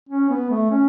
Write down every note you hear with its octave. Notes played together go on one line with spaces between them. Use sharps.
C#4
B3
A3
C#4